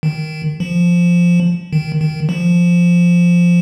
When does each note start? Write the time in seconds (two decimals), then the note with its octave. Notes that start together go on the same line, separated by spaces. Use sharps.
0.03 D#3
0.60 F3
1.73 D#3
2.01 D#3
2.29 F3